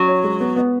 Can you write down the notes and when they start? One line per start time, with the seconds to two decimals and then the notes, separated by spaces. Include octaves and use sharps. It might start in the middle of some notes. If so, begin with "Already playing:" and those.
Already playing: F#3 C#4
0.08 C#5
0.24 G#3
0.40 B3
0.56 B3